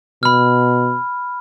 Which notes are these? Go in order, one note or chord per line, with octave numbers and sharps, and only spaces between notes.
B2 B5 F6